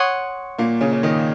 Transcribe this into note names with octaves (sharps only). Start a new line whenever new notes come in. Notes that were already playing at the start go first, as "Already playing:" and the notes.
Already playing: C#5 F#5 C6 D#6
A#2 A#3
C#3 C#4
C#4
D#3 D#4